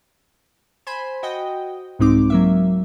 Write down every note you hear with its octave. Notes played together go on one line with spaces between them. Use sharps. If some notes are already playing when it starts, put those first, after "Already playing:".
C5 G#5 B5
F#4 D#5 G5
C2 G#2 G#3 C4 D#4 D6
F#3 A#3 E5